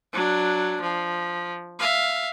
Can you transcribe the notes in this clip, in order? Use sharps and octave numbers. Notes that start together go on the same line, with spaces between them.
F#3 D4
F3
E5 F5